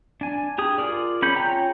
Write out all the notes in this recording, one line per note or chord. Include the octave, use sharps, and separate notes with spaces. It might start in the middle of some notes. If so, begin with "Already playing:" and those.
D4 G#5
G4 G#4 D#6
F4 G#4 A#4 D5
B3 C#4 B5 C#6 G6
F4 G#4 C#5 G5 A#5